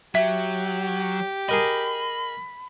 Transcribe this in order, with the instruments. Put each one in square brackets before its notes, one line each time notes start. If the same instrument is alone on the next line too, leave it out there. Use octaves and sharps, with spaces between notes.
[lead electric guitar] F#3 [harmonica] G4 [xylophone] E5
[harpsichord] G#4 A#4 D#5 [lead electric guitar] B5